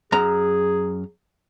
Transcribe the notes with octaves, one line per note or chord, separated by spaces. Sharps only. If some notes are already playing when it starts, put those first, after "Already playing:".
F#2 G#4 A#5